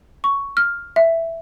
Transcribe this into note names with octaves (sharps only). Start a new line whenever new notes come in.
C#6
F6
E5